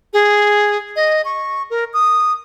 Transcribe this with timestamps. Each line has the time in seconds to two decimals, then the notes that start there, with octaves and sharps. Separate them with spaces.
0.13 G#4
0.96 D#5
1.25 C#6
1.70 A#4
1.94 D#6